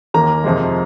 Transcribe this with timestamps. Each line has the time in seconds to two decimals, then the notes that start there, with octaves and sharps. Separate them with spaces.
0.14 D#2 D#3 A#3 A#5
0.44 F2 C3 F3 G#3